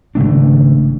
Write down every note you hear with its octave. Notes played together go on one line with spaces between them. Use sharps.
G#1 C#3 A3 D4